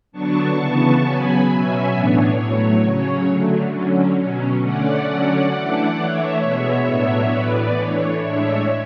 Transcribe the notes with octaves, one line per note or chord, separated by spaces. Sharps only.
D3 F#3 B3 D4 A5 C#6
C#3 E3 B3 A5 C#6
C#3 F#3 B3 G#5 B5
B2 F#3 C#4 E5 G#5
A2 E3 B3 D4 C#5
A2 F#3 A3 C#5
C#3 F#3 C#4 C#5
D3 F#3 A3
D3 F#3 C#4
B2 F#3 C#4
D3 A3 C#4 D5 F#5
D3 F#3 C#4
E3 A3 D4
E3 A3 D4 C#5 E5
B2 G#3 B3
A2 F#3 B3 D4
A2 E3 B3 B4 D5
E3 A3 D4 C#5
A2 G#3 D4 C#5 E5